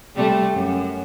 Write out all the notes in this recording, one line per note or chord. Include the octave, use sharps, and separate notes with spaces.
C3 G3 A3
F#2